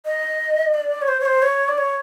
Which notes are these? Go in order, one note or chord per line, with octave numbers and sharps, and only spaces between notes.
D#5
D5
C#5
C5
C#5
C5
C#5
D5
C#5